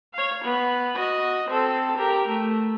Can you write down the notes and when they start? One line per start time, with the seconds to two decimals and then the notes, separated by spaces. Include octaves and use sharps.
0.13 C#5 F5
0.44 B3
0.96 F#4 D#5
1.49 C4 A4
1.97 G4 A#4
2.28 A3